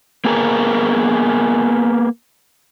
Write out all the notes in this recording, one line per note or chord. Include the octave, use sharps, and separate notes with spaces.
A#3 B3 G#4 A#4